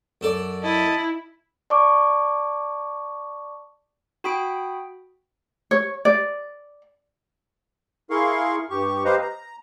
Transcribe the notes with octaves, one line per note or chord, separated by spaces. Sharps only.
F#2 A4 D5
E4 D#5 A5
D5 A5 C#6 D6
F#4 G5 B5 D#6 B6 D7
C#5
D5
E4 G#4 A#4 F5 C6 C#6
G2 G4 C#6
G4 B4 C5 D#5 F5 A#5
A#5